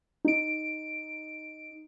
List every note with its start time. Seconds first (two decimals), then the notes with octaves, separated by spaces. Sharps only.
0.25 D#4 D7